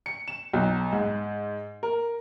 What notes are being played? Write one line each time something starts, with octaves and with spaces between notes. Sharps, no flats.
C#7
E7
B1
G#2
A#4